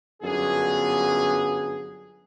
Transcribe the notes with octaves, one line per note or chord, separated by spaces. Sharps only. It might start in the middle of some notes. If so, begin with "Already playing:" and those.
G1 F#2 D3 B3 F4 G#4